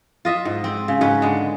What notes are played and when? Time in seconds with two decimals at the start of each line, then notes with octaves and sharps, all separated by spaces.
0.25 F4 D#5 E5
0.45 G#2
0.64 C4
0.88 C#3
1.01 G#2 C#4 B4
1.22 D3 G#3